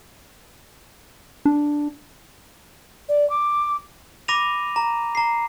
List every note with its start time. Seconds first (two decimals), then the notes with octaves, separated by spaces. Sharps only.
1.45 D4
3.09 D5
3.30 D6
4.28 B5 D6 A#6 D#7 F7
4.76 A#5
5.15 A#5 C7